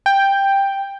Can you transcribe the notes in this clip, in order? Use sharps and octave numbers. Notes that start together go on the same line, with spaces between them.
G5